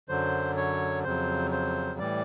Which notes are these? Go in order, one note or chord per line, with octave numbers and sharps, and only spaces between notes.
F#2 D3 F#3 C5
C#5
F2 C#3 F#3 C5
C5
A2 E3 G3 D5